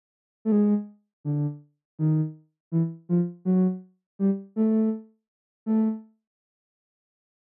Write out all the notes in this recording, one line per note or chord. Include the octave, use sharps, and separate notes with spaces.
A3
G#3
D3
D#3
E3
F3
F#3
G3
A3
A3